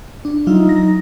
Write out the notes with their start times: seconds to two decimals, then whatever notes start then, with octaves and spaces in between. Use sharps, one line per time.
0.25 D4
0.47 F#3 D#4 F4 E5
0.69 A#6